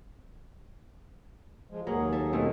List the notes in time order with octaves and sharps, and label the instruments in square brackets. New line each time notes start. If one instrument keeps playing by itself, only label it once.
[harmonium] F3 G#3
[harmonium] D#2 G#4 [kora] F#3 [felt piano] A#3 A#5
[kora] A4 E5
[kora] B2 G#3 A3 [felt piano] C4 A#4